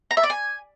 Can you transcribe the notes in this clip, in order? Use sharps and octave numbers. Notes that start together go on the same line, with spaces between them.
A#5
E5
D5
G#5